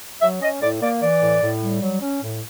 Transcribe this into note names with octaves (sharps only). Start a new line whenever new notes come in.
F#3 E5
C#4 D#5
A2 D5
A#3 D5
E3 D5
A2
A2
G3
F#3
C#4
A2